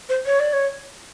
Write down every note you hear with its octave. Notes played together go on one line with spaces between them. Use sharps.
C5
C#5
D5
C#5